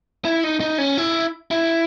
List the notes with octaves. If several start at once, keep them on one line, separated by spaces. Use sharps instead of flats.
E4
D#4
D#4
C#4
E4
E4